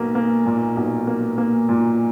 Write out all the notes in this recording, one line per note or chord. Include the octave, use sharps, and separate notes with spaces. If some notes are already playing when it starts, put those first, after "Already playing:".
Already playing: B1 A#3
A#3
A#2
B1
A#3
A#3
A#2